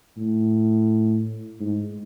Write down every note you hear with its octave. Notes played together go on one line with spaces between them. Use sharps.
A2
G#2